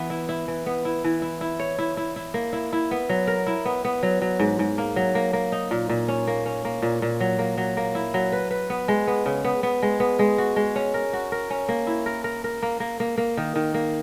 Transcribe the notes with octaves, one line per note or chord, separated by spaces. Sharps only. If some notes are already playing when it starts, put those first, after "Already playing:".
Already playing: E3 B3
E4
E4
E3
B3
E4
E3
E4
E4
C#5
E4
E4
E4
A#3
E4
E4
B3
F#3
A#4
E4
B3
B3
F#3
F#3
G#2
G#2
A#3
F#3
A#3
A#3
D#4
A#2
A#2
C#4
A#3
C#4
A#3
A#2
A#2
F#3
A#3
F#3
A#3
E4
F#3
B4
B4
B3
G#3
B3
C#3
B3
B3
G#3
B3
G#3
F#4
G#3
C#4
A#4
F#4
A#4
C#4
A#3
E4
A#4
A#4
A#4
A#3
A#3
A#3
A#3
D#3
D#3
A#3